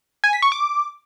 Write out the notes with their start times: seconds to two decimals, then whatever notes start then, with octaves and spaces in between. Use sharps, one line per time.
0.24 G#5
0.33 B6
0.42 C#6
0.52 D6